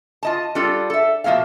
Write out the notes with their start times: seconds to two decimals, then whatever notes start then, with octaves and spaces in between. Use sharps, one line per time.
0.23 F4 D#5 A5
0.55 G3 D4 F4 A4
0.90 A4 E5
1.24 B2 F3 A#3 E5 F5